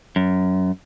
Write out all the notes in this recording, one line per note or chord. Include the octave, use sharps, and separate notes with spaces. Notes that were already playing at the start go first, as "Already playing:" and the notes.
F#2